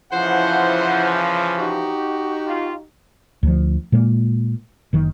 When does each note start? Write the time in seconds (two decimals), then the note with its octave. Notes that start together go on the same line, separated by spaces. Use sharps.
0.12 C#3 E3 F3 E4 C5 F#5
1.59 D#4 F#4 G4
2.45 F4
3.43 D2 F3
3.92 A#2 G#3 A#3
4.93 F#1 D#3